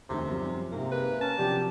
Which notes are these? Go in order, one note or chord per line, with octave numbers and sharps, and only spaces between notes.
E1 D2 C3 D#4
F#2 F3 G3
G#2 C3 G#3 A#3
G#4 A#4 B4
C#4 A5
C3 F3 F#3 D4 G4